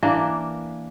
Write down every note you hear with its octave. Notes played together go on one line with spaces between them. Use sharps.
E3 A#3 D4